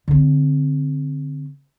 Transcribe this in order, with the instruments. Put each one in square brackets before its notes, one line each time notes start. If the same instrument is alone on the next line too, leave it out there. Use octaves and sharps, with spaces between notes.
[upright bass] D3 C4